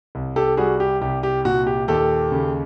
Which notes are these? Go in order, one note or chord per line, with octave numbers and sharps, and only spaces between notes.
C2
G4 A4
G3 F#4 G#4
G4
C2 G4
G4
A#2 F#4
G4
D#2 G4 A4
C#3